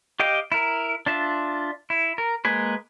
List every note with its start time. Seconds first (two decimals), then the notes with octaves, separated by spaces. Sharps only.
0.20 G4 D#5 F5 G5
0.52 E4 A#4
1.06 D4 F4 E5
1.90 E4
2.18 A#4
2.45 G#3 A#3 G#4 B4